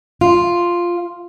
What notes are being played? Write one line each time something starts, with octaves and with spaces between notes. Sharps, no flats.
F4